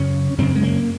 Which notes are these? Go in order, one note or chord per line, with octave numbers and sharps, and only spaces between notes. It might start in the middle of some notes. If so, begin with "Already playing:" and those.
Already playing: F#2 C#3 C#4
F#2 C#3 C4
G#3
A#3